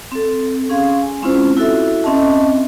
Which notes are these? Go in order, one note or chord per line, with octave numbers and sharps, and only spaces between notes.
C4 A4
C#4 G#4 F5 C6
G#5
G#3 C4 C#4 E4 F4 C5
E4 F#4 A4 E5
C4 C#4 D#5 E5 A5